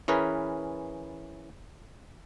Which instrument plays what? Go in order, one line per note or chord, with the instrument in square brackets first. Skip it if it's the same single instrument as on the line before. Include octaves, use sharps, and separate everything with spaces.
[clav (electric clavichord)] E3 C#4 G#4 A#4 B4